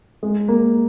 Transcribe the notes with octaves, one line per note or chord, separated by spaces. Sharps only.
G#3
A#3